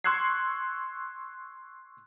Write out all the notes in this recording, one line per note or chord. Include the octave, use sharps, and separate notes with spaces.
C6 C#6 E6 F#6 G#6 C7